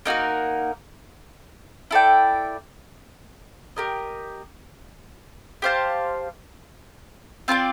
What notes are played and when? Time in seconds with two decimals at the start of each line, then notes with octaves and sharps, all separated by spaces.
0.05 A#3 D#4 F#4 A#4
1.91 E4 A4 D5 G5
3.76 G4 A#4 D#5
5.62 G4 C5 F5 A5
7.48 C4 F4 A#4 D5